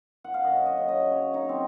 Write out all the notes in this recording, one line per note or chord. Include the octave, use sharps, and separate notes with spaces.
F#5
F5
F#2 D#5
D#5
C#3 F#3
D#5
F#2 C#5
D#4
C#3 F#3 C4